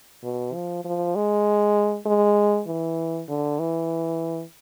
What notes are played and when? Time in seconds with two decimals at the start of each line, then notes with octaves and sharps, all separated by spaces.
0.23 B2
0.53 F3
0.84 F3
1.15 G#3
2.06 G#3
2.67 E3
3.28 D3
3.59 E3